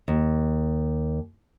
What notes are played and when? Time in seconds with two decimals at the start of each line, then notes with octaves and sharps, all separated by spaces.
0.08 D#2